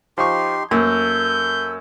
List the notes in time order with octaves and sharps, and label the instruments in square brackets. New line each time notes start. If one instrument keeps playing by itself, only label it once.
[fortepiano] F3 C#6 [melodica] D#4 G4 C6
[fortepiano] F#2 [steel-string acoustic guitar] A#3 [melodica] A4 [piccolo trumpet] G6